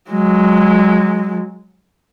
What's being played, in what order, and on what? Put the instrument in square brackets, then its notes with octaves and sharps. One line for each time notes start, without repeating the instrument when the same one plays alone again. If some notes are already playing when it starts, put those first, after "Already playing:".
[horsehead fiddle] F#3 G#3